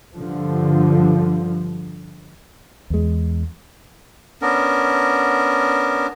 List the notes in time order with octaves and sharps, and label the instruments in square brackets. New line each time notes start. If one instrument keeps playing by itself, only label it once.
[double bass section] G2 D3 F3
[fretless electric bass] E2 G#3
[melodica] B3 C#4 D4 A#4